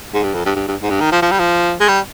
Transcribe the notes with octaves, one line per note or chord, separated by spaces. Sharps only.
G#2
G2
F2
G2
G2
G2
G#2
G2
D#3
F3
F3
G3
F3
G#3
G3